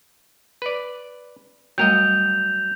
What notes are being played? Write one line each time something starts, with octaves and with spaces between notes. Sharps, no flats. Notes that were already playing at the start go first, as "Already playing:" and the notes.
B4 D5
F#3 G3 A3 A#4 D#5 G5 G6 F7